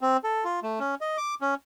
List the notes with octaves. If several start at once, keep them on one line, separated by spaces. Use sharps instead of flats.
C4
A4
F4
A3
C#4
D#5
D6
C#4